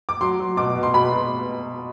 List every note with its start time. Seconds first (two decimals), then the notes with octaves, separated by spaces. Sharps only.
0.09 D6
0.21 F#3 C6
0.40 F#3
0.57 B2 D6
0.75 B2
0.83 C6
0.94 B2 B5
1.12 B2